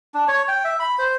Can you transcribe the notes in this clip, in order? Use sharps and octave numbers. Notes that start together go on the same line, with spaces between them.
D4
C#5
G5
E5
B5
C5